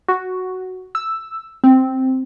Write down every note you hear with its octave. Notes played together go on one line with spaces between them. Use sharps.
F#4
E6
C4